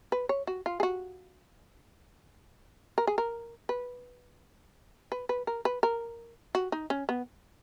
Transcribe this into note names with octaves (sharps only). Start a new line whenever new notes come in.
B4
C#5
F#4
F4
G#4
F#4
A#4
G#4
A#4
B4
B4
B4
A#4
B4
A#4
F#4
D#4
C#4
B3